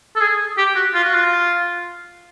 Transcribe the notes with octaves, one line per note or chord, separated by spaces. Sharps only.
A4
G#4
G4
F#4
F4
F#4
F4